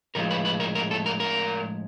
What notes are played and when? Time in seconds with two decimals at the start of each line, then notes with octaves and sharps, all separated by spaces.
0.15 A2 F3 G#3 A#4
0.30 B4
0.45 B4
0.60 A#4
0.75 A#4
0.91 A4
1.06 A#4
1.20 A#4